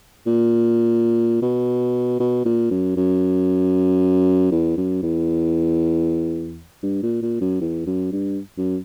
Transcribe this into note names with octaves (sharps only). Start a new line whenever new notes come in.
A#2
B2
B2
A#2
F#2
F#2
E2
F#2
E2
G2
A#2
A#2
F#2
E2
F#2
G2
F#2